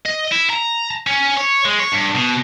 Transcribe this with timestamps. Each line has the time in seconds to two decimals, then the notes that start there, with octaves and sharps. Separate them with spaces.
0.05 D#5
0.32 E4
0.50 A#5
1.07 C#4
1.37 C#5
1.65 G#3
1.79 C#5
1.92 G2
2.15 B2